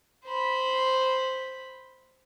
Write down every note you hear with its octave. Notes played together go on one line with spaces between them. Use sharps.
C5 B5